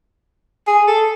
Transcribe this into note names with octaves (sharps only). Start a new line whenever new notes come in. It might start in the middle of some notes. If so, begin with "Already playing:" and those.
G#4
A4